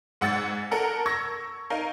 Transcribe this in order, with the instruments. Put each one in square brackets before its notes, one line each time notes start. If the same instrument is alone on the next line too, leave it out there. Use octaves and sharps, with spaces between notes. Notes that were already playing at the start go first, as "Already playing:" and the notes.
[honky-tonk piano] G#2 F#5 E6 A6
A4 A#4 F#5
C#6 E6 G#6 A#6
D#4 A#4 F5